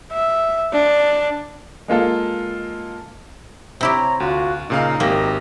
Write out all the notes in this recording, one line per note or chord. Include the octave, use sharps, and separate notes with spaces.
E5
D4
G#3 A#3 F4 A4
C3 E4 G4 C5 C#5 A#5
D2 F4 F#4
A#2 C#3 D#4 F5
G#1 A#3 G4 A#6